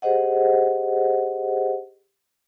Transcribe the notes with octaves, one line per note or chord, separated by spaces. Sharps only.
G4 G#4 C5 D#5 F#5